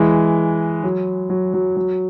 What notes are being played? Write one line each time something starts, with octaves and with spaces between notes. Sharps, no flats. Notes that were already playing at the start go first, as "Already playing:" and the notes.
Already playing: E3 G#3
F#3
F#3
F#3
F#3